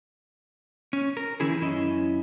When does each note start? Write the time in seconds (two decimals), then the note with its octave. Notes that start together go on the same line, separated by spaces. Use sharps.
0.93 C#4
1.17 A#4
1.40 D#3 E3 C#4 E4 G#4
1.61 F#2 C#4 E4 D#5